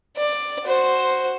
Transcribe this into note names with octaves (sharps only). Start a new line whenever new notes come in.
D5
F#4 C5